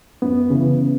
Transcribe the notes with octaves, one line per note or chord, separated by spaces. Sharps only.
F#2 B3
C#3 E3